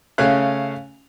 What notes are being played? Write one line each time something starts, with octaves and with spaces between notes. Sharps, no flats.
C#3 A3 C#4 F5 F#6